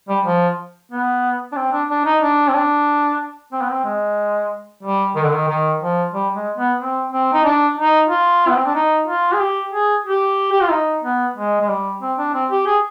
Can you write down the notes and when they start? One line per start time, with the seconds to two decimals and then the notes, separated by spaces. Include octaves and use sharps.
0.09 G3
0.25 F3
0.92 B3
1.52 D4
1.56 C4
1.72 D4
1.90 D4
2.06 D#4
2.22 D4
2.48 C4
2.54 D4
3.52 C4
3.62 B3
3.71 C4
3.85 G#3
4.83 G3
5.15 D#3
5.24 D3
5.33 D#3
5.48 D#3
5.81 F3
6.13 G3
6.35 G#3
6.58 B3
6.79 C4
7.12 C4
7.33 D#4
7.45 D4
7.77 D#4
8.09 F4
8.49 B3
8.57 C4
8.66 D4
8.75 D#4
9.07 F4
9.33 G#4
9.40 G4
9.73 G#4
10.06 G4
10.52 G4
10.62 F4
10.70 D#4
11.04 B3
11.37 G#3
11.61 G#3
11.69 G3
12.02 C4
12.18 D4
12.34 C4
12.51 G4
12.66 G#4